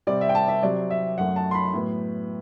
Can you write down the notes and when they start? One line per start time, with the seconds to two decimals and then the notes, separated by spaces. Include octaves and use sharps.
0.07 C3 G3 C4 D5
0.21 E5
0.29 G5
0.35 A5
0.48 E5
0.63 C3 F#3 C4 D5
0.91 E5
1.18 F#2 F#3 A3 F#5
1.36 A5
1.51 C6
1.55 B5
1.73 A2 F#3 B3